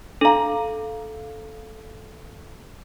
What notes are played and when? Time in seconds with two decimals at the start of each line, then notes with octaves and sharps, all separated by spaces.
0.21 D4 A4 F5 A#5